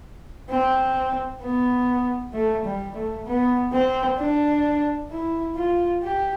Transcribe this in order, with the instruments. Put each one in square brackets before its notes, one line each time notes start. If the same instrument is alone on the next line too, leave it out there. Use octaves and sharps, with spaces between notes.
[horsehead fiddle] C4
B3
A3
G3
A3
B3
C4
D4
E4
F4
G4